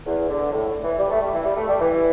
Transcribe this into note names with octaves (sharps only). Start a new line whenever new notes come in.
E2
D3
A2
E3
G3
A3
G3
E3
G3
A3
G3
E3